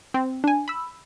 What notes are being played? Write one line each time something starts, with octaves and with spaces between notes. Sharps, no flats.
C4
D4 G#5
B5 E6